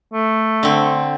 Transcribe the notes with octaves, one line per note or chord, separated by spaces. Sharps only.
A3
D3 C4